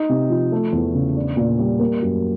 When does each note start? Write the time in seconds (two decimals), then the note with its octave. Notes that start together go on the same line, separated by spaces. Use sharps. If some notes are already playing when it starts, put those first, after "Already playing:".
Already playing: D#4
0.09 C3
0.30 F3
0.52 A3
0.73 E2
0.95 C#3
1.16 D4
1.37 A#2
1.59 G3
1.80 A#3
2.02 F#2